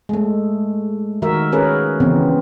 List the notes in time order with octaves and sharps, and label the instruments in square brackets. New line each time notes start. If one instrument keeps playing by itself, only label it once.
[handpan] G#3 A3
D#3 F#4 A#4 E5
C#4 G#4 A#4 B4
C#3 E3 B3 C4